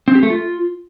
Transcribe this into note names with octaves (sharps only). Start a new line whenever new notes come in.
C4
G4
A3
F4